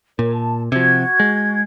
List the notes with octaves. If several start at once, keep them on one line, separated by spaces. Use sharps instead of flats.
A#2 A#4 C#5
A5
C3 F3 F#4 G#6
G#3